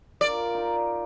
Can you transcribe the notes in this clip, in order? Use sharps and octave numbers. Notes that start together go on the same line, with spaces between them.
F4 A#4 D5
D#4